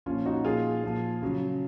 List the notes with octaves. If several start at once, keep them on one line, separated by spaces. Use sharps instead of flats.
A#2 F3 C#4 F4
D#4 F#4
A#2 F3 F4 G#4
A#2 F3
C#3 F#3